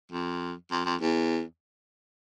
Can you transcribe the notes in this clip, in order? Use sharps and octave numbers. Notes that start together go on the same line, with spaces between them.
F2
F2
F2
E2